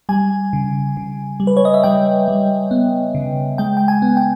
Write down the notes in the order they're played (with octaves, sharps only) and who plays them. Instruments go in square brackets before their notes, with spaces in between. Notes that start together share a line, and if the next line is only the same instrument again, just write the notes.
[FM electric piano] G3 G#5
C#3
C#3
G3
B4
C#5
D#5
E5
G3 G5
G3
B3
C#3
G#3 G5
G5
G#5
B3
G5